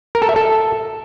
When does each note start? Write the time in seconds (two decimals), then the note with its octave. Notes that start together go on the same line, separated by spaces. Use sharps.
0.15 A#4
0.22 A4
0.29 E5
0.36 A4